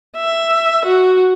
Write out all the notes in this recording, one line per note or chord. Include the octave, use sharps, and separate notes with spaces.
E5
F#4